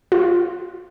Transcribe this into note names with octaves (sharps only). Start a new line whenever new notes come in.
F4